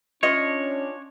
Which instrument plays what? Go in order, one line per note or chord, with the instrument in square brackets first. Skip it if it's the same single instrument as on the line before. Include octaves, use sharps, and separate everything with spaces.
[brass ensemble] C#4 D4 [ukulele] F4 D#5 [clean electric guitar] C#5